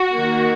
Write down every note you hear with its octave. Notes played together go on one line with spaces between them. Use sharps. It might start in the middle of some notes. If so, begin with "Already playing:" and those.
Already playing: F#4
D#3 A#3